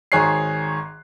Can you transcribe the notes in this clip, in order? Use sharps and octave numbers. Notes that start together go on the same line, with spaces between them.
G#1 D#3 G#4 C#5 F#6 C7